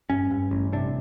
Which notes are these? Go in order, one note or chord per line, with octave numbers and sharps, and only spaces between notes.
G2 C#4
G2
A1
C3 D4